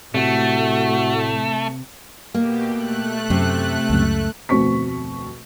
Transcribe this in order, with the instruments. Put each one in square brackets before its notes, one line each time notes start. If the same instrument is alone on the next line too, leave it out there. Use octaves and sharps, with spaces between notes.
[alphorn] A2 [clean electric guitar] C3 [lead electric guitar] A3 [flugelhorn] F#4
[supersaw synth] B2 G4 [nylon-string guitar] A#3
[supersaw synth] A3 F#6
[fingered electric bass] F#2 [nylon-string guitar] C3
[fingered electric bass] C#2 F#2
[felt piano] F1 D2 B2 C4 C#6 B6